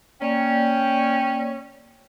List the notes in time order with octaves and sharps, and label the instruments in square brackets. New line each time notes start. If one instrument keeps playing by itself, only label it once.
[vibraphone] A#3 D5 [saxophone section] C#4 [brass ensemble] G5